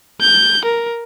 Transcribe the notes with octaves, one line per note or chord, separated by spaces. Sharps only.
G6
A#4